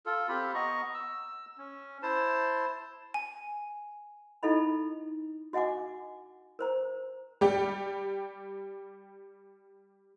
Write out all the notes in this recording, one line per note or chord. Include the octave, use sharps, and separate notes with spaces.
F4 A4
C4 F4 G4 B5
B3 D#5 A#5 C#6
E6
C#4
E4 C5 A5
G#5
D#4 E4 A4 D#5 B5
F#4 D#5 F#5 G#5 D6
A#4 C5 A#5
G3 G4